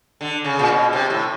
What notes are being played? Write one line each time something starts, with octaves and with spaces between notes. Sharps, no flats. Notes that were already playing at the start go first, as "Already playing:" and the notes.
D3
C#3
A#2
B2
C3
A2